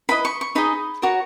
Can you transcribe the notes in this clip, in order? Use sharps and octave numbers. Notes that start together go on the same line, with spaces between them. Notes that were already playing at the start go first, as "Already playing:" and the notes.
E4 B4 D#5 B5
C#6
C#6
D#4 G#4 D#5 B5
F#4 A#4 C#5 C#6